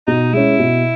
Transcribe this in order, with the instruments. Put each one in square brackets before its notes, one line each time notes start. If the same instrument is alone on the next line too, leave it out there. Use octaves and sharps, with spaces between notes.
[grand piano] B2 [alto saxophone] D#4
[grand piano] G#3 C#4 [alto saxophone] E4
[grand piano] B2